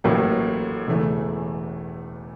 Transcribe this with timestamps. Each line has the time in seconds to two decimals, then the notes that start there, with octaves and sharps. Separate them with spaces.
0.04 A1 A2 F#3 A#3
0.87 E1 E2 C#3 E3 A3